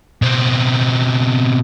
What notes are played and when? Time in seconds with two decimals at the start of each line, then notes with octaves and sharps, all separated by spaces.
0.22 B2 C4